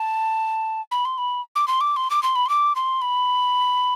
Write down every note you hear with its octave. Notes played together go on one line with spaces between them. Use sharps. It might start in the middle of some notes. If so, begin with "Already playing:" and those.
Already playing: A5
B5
C6
B5
D6
C6
D6
C6
D6
C6
B5
C6
D6
C6
B5